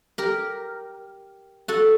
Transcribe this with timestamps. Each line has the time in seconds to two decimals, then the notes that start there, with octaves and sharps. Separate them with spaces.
0.18 G4 A#4
1.68 F#4 A4